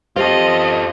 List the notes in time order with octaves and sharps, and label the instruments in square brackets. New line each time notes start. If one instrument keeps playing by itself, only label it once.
[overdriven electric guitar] F4 A4 [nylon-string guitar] G4 C5 [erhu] D#5